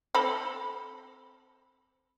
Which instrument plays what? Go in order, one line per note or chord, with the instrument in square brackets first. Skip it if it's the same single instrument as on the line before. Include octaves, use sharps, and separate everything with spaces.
[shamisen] C4 A4 B5